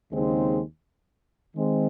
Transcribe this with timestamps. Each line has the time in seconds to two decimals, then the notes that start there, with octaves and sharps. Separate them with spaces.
0.11 D#2 C#3 G#3 C4 D#4
1.56 D#3 G#3 C4